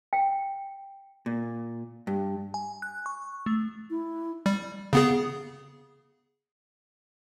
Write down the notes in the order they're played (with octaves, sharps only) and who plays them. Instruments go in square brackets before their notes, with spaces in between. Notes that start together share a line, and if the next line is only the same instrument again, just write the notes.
[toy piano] G5
[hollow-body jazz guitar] A#2
G2
[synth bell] G#5
F#6
C#6
A3
[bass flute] E4
[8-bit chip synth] G3
C#3 B3 G#4